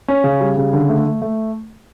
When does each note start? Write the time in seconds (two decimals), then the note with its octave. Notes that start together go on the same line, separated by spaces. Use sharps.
0.08 C#4
0.24 C#3
0.41 G3
0.57 C#3
0.73 D3
0.89 A3
1.05 A3
1.22 A3